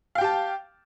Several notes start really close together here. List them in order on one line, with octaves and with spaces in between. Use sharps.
F5 G5 G4 A5